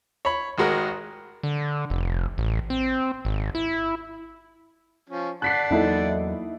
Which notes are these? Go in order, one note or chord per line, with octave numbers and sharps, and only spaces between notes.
C#5 B5
G#1 G#3 F#4 A#4
D3
F1
A1
C4
G#1
E4
F3 C#4
D5 F#5 A5 F#6 B6 C7
E2 F#3 A#3 D#4 E4 A4